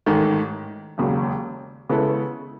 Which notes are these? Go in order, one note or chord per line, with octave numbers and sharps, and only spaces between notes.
A1 G#2 D#3 A3
E1 D#2 C#3 F#3
C#3 G#3 B3 E4 A4